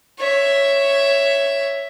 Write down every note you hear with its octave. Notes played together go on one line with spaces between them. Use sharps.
C#5 E5